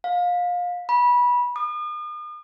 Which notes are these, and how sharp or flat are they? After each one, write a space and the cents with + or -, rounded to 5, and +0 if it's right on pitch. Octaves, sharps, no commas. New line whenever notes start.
F5 +25
B5 -20
D#6 -40